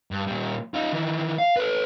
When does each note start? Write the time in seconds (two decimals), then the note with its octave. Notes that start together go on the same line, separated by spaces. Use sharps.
0.11 G2
0.27 A#2 G3
0.74 D#4 F4
0.93 D#3 E3
1.38 F5
1.57 A4 B4